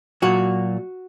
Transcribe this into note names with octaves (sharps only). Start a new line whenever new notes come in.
A#2 F#3 F#4